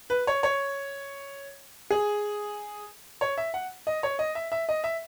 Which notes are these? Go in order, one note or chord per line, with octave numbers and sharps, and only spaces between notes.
B4
C#5
C#5
G#4
C#5
E5
F#5
D#5
C#5
D#5
E5
E5
D#5
E5